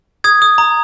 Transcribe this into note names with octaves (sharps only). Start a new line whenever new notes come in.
D#6 G#6
D#6
A#5